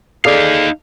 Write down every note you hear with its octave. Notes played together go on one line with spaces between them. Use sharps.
D#4 G#4 A4 D5 F5